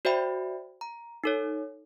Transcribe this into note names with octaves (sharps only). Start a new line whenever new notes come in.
F#4 C5 D5 E5 G5 B5
A#5
D#4 A4 C#5